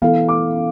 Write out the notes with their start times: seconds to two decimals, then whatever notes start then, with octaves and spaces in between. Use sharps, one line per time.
0.02 E3 B3 E4 A4 F5
0.28 D6